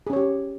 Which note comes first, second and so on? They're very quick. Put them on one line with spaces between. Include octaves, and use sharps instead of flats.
G#4 C#4 C#5 G4